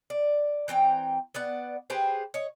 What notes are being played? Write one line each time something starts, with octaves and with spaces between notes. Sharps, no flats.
D5
E3 C4 G5 A#5
B3 D5 F#5
G4 G#4 B4 C5
C#5 D#5